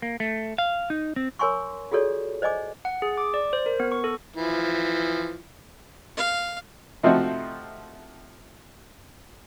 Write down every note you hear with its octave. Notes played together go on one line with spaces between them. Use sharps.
A#3
A3
F5
D#4
C4
A#4 C#5 G#5 C6 C#6
F4 F#4 G#4 A4 C#5 D5
C5 D5 D#5 G#5 D6
F#5
G#4
D6
D5
C5
A#4
B3
C#6
A4
E3 F3
F5
C3 F3 A3 C4 D#4 F#4